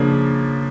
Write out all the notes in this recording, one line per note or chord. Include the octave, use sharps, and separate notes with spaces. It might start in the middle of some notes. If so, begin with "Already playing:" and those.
Already playing: C#3 F3 A#3 D4